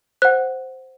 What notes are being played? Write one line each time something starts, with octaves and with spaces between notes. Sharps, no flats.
C5 F#5 F#6